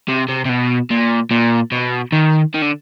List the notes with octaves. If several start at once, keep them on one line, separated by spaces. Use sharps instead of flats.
C3
C3
C3
B2
A#2
A#2
B2
D#3
D#3
D3